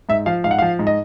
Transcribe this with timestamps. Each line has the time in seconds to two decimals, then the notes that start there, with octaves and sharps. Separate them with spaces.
0.09 G#2 E5
0.26 F3 F5
0.44 G#2 F5
0.51 F#5
0.59 F3 F5
0.79 G#2
0.87 D#5